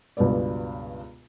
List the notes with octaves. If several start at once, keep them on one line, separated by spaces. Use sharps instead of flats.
C#2 G2 B2 G#3 B3 D5